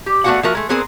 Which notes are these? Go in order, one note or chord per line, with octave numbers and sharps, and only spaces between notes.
G4
A3 B3 D#4 F#4 F5 F#5
F3 A#3 F#4 A#4 E5
G#3 A3
B3 C4 G#4 A#4 C5